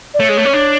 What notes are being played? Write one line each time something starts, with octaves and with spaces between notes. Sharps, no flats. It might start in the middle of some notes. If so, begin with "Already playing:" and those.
D5
A3 C#5
G#3
A3
C#4
D4